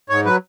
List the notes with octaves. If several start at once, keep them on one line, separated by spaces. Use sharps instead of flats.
G#2 C#5
F#3 B4